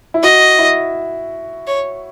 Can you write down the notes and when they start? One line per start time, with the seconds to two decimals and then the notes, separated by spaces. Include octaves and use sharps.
0.14 E4
0.23 F#4 D#5
0.59 E4
1.67 C#5